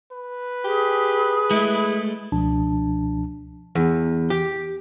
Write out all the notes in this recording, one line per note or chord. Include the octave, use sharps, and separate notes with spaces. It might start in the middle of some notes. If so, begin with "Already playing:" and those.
B4
G4 G#4
G#3 A3 E4
C#2 B2 F3 D4 A5
E2
G4